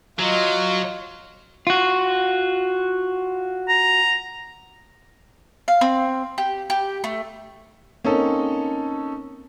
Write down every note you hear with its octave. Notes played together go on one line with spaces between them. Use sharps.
F#3 F4 D#5
F4 F#4
A#5
F5
C4
G4
G4
A3
A#3 C4 C#4 D#4 A4